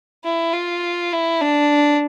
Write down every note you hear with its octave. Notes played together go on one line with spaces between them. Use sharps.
E4
F4
E4
D4